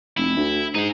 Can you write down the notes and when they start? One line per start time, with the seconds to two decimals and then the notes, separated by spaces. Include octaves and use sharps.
0.17 F1 E4
0.37 D2
0.75 G#2 D#4 G#4